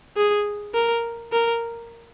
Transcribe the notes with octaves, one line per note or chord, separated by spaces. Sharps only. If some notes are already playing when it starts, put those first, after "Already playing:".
G#4
A#4
A#4